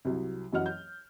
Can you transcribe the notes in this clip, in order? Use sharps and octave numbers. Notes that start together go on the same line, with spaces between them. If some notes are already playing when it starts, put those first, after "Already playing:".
C2 F#3
F#2 E3 F#3 D#5 F#5 F6
G6